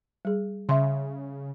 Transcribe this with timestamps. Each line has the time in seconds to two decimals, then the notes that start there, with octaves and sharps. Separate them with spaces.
0.25 G3 G#4
0.69 C#3 E5 C6